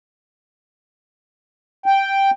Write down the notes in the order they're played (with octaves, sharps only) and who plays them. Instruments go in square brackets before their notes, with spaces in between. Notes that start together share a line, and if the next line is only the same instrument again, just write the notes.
[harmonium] G5